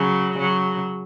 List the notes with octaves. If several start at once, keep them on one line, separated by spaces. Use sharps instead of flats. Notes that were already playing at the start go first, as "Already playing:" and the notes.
Already playing: C#3 F#3
C#3 F#3